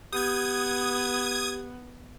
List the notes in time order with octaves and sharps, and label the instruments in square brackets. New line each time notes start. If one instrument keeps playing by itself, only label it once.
[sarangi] B3 [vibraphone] G4 [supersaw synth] D#6 G#6